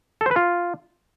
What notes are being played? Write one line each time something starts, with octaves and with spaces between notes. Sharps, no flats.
A4
C5
B4
F4